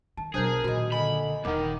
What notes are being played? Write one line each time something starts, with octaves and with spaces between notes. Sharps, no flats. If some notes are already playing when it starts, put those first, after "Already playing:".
D#3 A5
B1 F#3 D4 G#4 A#4 C5 G6
A#2 D#3 F#4 D#5
D3 D#5 G#5 B5
D#1 D#2 D#3 A#4 F#5 D6